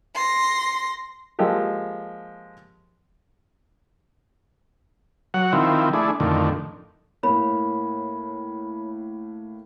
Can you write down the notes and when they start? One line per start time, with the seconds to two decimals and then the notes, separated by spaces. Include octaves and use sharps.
0.15 C6 A#6
1.39 F3 G#3 A#3 G4 A4
5.34 F#3 F#5
5.53 D#3 F3 C4 E4
5.93 A3 D4 E4 G#4
6.20 F2 A2 D3 D#3
7.23 A2 A#3 C#5 B5